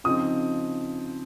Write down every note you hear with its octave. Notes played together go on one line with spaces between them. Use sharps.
C#3 F3 C4 D#4 D#6